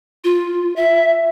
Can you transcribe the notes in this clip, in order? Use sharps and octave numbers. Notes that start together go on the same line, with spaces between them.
F4
E5